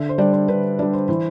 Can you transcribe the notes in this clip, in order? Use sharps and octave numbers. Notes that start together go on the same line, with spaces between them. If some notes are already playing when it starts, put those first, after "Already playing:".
Already playing: D3 E5
C5
G3 D4 D5
C5
D3 B4
G3 D4 D5
C5
E3 C5